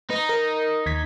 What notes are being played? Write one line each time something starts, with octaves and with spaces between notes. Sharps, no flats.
D#4 B4
A#4
D#2 G#6 B6